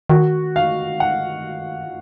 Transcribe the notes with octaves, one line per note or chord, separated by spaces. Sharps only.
D#3 F#4
F5
F#5